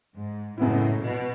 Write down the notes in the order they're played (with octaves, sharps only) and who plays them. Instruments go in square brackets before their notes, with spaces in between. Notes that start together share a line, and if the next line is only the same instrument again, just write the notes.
[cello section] G#2
[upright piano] F#2 C#3 G#3 B3 E4 [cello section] A2
[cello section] B2